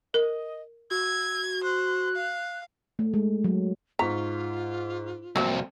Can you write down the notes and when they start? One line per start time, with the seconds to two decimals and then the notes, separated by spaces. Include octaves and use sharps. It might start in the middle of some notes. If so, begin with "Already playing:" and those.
0.14 A#4 D#5
0.91 F#4 E6 G#6
1.64 C5 F#6
2.16 F5
2.99 A3
3.14 G#3
3.44 F#3
3.99 G#2 F4 A#5 C#6 B6
5.36 C2 F2 F#3 A#3 E5